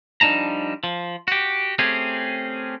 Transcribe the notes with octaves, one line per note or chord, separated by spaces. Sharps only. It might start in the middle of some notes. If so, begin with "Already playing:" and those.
F3 G3 D4 D#4 A5 A#5
F3
F#4 G4
A3 C4 C#4 G4 G#4